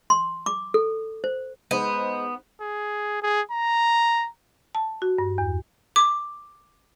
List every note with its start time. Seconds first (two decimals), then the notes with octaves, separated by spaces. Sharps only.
0.10 C6
0.46 D6
0.74 A4
1.24 C5
1.71 G#3 B3 D#4 C5
2.61 G#4
3.22 G#4
3.51 A#5
4.75 A5
5.02 F#4
5.18 G2
5.38 E2
5.96 D6